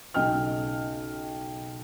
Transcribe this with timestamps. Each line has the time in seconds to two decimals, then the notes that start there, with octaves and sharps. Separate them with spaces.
0.14 B1 C#3 D#5 G5 F6